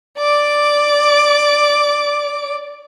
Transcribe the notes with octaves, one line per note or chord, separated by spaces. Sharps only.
D5 D6